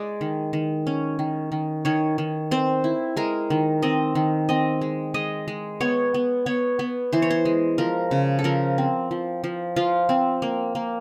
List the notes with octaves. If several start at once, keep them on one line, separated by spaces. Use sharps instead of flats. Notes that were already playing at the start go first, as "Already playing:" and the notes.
Already playing: G#3 D5
D#3
D#3
C#4
D#3
D#3
D#3 C#5
D#3
C4 C5
E4
G#3 A#4
D#3
C4 D#5
D#3
C4 D#5
G#3
G#3 D#5
G#3
B3 C#5
B3
B3 C#5
B3
E3 C5
C#5
C5
G#3
F3 A#4
C#3
A4
F3 A#4
C4
F3
F3
F3 F4
C4
A#3
A#3